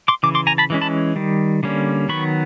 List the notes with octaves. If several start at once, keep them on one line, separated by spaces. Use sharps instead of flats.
C6 D6
C#3 E3 D6
C6 D6
G#5 A#5
A5 B5
E3 G#3 C#4
A5 B5
D#3 G3
D3 G3 A#3 C#4
D#3 F#3 B3 B5 C#6